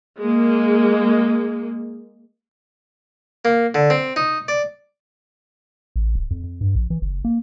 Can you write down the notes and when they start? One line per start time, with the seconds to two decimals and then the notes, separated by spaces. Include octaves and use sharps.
0.19 G#3 A#3
3.45 A#3
3.75 D3
3.90 C4
4.16 D#4
4.48 D5
5.96 A1
6.15 D1
6.31 F2
6.43 F2
6.61 G2
6.75 A#1
6.90 E3
7.02 F#1
7.25 A#3